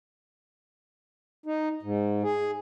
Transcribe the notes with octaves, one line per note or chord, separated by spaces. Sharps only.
D#4
G#2
G#4